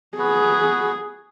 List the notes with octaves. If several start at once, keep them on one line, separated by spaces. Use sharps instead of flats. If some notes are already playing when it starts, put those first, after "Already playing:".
B3 F#4 G#4 B4